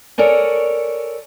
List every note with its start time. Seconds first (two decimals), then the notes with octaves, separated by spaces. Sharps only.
0.18 A4 A#4 C#5 D5 G#5